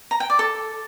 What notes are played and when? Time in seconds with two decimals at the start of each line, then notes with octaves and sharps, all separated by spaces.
0.11 A#5
0.20 G5
0.30 D5
0.39 A4